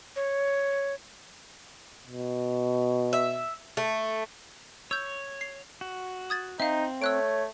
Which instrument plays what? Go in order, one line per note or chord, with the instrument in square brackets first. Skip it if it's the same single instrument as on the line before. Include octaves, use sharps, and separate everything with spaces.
[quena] C#5
[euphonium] B2
[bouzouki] E5
A3
[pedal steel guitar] C#5 [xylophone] E6 G6
[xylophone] C7
[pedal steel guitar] F#4
[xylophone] D#6 G#6 A6
[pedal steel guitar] C4 [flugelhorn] D#4 [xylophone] E5 F5
[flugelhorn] A3 [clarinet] C#5 [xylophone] E6 F#6 D7